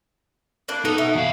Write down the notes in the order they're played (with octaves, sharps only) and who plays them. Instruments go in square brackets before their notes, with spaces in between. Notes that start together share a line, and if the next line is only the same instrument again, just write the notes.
[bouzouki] A#3 D4 B4
[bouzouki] B3 A4 [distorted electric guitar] D#4
[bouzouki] B2 E4
[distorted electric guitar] E2 F5